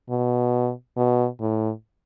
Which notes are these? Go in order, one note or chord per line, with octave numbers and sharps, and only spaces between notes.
B2
B2
A2